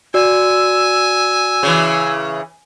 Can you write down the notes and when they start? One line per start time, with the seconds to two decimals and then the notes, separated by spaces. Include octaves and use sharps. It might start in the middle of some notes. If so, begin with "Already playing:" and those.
0.14 F#4 D5 G#5 E6
1.63 C#3 E3